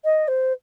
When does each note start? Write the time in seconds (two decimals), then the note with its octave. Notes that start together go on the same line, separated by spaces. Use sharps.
0.04 D#5
0.28 C5